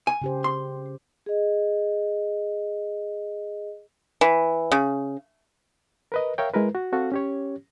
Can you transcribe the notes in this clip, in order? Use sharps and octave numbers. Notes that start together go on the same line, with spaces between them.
G#5
C#3 G4 C5
C6
G#4 D#5
E3
C#3
A#4 B4 D#5
A#4 C#5 E5 F5 G5
G#3 E4 A#4 B4
F#4
C4 F#4 A4 F5
C#4 G4 C#5